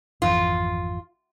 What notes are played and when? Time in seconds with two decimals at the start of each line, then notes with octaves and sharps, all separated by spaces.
0.22 G#1 F2 E3 F4